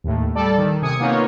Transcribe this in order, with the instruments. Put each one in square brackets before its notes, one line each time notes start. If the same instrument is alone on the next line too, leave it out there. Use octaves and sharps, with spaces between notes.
[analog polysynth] D#2 A2
G3 A4 D5
D#3
C3 G#5 D#6 C#7
A#3 B3 D#4 F4 C#5